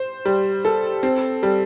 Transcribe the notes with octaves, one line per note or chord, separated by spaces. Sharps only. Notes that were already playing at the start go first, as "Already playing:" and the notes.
Already playing: C5
G3
A4
C4
G3